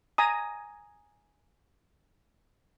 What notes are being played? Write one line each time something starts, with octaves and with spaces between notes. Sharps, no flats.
G#5 A#5 D#6